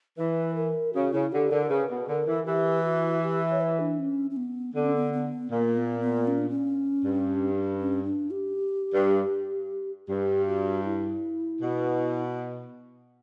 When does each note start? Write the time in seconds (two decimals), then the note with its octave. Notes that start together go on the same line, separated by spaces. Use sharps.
0.18 E3 B4
0.56 A#4
0.94 C#3 F#4
1.13 C#3 E4
1.32 D3 G4
1.51 D3 A#4
1.69 C#3 B4
1.90 B2
2.08 D3 A#4
2.27 E3
2.46 E3 G4
2.84 F#4
3.23 G4
3.51 C#5
3.61 B4
3.80 D4
3.99 C#4
4.30 C#4
4.37 B3
4.75 D3 B3
4.85 C#4
4.96 B3
5.13 B3
5.51 A#2 A#3
5.77 B3
6.01 B3
6.27 C#4
6.38 D4
6.50 C#4
7.04 G2
7.80 C#4
8.05 D4
8.31 G4
8.94 G2
10.08 G2 G4
10.47 F#4
10.85 E4
11.61 B2